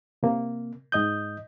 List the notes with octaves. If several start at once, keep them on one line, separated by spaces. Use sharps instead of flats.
C3 A#3
G#2 D#5 D#6 G6